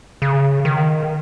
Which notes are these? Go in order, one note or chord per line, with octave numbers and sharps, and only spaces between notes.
C#3
D#3